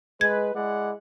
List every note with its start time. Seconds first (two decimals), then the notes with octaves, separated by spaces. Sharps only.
0.21 G#3 B4 G#6
0.55 G#3 E4 D5 F#5